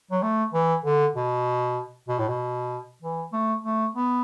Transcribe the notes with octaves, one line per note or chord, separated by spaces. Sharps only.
F#3
A3
E3
D3
B2
B2
A2
B2
E3
A3
A3
B3